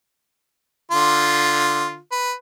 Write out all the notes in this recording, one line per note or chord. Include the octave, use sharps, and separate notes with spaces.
D3 F4
B4